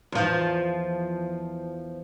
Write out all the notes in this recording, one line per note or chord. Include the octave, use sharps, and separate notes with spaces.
E2 F3